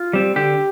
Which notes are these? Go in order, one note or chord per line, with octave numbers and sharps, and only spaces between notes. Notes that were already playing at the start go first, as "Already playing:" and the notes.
Already playing: F4
G3 C4
D3 G4